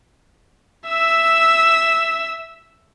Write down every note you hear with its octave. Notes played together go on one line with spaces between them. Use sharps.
E5 E6